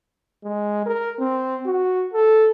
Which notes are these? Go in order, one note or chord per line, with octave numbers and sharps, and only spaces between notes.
G#3
A#4
C4
F#4
A4